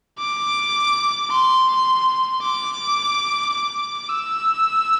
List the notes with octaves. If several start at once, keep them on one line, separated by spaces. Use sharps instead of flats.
D6
C6
D6
D6
E6